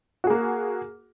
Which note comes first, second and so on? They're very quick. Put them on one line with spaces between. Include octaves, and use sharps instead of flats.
F#4 G#4 A#3